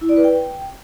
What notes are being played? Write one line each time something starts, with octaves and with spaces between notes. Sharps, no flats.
E4
D5
B4
G5